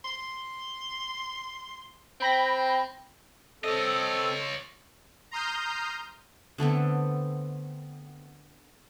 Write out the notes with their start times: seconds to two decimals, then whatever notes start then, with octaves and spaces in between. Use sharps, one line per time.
0.05 C6
2.20 C4 G5 B5 A#6
3.64 C4 A4 C#5 D#5
5.31 A#5 C6 D#6 F6 G6
6.58 D3 A3 B3 C4